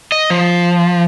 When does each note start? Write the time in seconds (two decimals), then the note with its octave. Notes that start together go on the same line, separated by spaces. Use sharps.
0.12 D#5
0.30 F3